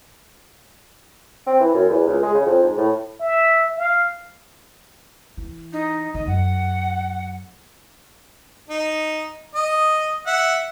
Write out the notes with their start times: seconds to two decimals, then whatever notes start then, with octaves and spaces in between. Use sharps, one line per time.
1.47 C4
1.60 E3
1.74 F#2
1.89 E2
2.07 C#2
2.22 G#3
2.34 C#3
2.45 F2
2.63 G#2
2.78 A2
3.21 E5
3.77 F5
5.37 E3
5.73 D#4
6.14 D#3 D#5
6.27 F#2 F#5
8.70 D#4
9.55 D#5
10.26 E5 F#5